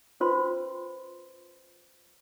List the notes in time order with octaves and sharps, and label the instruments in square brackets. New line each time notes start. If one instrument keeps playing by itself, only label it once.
[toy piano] C#4 F4 B4 C5 B5 C6